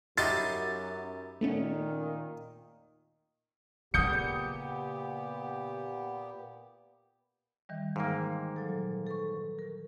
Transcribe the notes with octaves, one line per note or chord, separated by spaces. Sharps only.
F#2 D#4 E4 G4 C6 A6
A#2 D#3 A3 B3 C#4
A#2 C#3 A#3 B3 G4 D#6 G6 C#7
D#3 E3 G3
G#2 A#3 F5 G5
F#3 A4
A#2
A4 B4 C#6
A#4